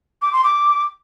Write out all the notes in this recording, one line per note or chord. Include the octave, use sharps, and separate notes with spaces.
D6
C6
D6